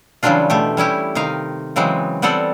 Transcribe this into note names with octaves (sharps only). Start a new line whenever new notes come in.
C#3 E3 F#3 G3 D4 F4
B2 A3 G4
G3 C#4 E4 G4
C3 D#3 D#4 F5
C#3 E3 F#3 G#3 C4
G3 B3 C4 A4 D5 F#5